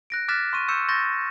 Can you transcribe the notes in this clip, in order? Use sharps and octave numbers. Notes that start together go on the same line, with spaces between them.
F#6 A#6 D7
D6 F6 F#6 A6 B6 E7
C6 C#6 D#7
C#6 E6 G6 C#7 E7
C6 C#6 G6 A6 A#6